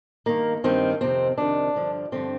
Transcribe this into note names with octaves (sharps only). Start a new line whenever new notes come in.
G2 D#3 A#3
G2 D#3 C4
F2 C3 D#3 C4
F2 C3 D#3 D4
G2 D3 F3
G2 D3 F3 C4